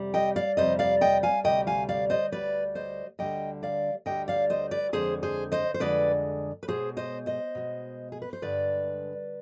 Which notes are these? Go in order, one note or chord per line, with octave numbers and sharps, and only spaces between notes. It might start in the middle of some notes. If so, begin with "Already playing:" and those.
Already playing: F2 C3 G3
D#5 G5
D5 F5
F2 C3 G3 C5 D#5
D5 F5
D#5 G5
F5 G#5
D2 C3 G3 D#5 G5
F5 G#5
D5 F5
C5 D#5
D2 C3 G3 B4 D5
C5 D#5
D2 D3 G3 D#5 G5
D5 F5
D2 D3 G3 D#5 G5
D5 F5
C5 D#5
B4 D5
F2 D3 G#3 G#4 C5
G#4 C5
C5 D#5
C5
F2 D3 G#3 B4 D5
B4
B2 G#3 G#4 C5
C5 D#5
C5 D#5
B2 G#3
G#4
B4
C5
G2 D3 G#3 B4 D5